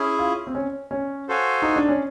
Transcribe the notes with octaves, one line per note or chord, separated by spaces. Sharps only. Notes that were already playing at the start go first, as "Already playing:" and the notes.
Already playing: C#4 E4 G#4
F4
C4
C#4
C#4
F#4 A4 C5 F5 G#5
D#4
D4
C#4